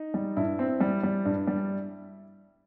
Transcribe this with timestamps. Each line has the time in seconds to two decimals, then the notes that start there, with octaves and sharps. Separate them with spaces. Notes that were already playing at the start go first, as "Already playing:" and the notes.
Already playing: D#4
0.14 G3
0.37 G2 E4
0.59 C4
0.80 G3
1.03 G3
1.25 G2
1.47 G3